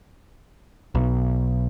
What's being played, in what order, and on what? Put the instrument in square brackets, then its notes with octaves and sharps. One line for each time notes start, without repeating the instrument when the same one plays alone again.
[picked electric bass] B1